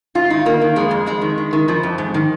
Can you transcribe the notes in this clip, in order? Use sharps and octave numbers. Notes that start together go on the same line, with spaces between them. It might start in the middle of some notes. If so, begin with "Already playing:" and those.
G#2 F4
D#3 D#4
D#3 A#3
D#3
F2 G#3
F2
F2 G#3
D#3
D#3
D#3
F2 F3
F2
G#2
D#3